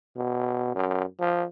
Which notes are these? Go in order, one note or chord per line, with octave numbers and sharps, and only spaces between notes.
B2
F#2
F3